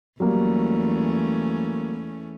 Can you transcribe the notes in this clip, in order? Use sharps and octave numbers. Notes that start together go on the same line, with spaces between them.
E2 F#3 G3 A3 A#3 C#4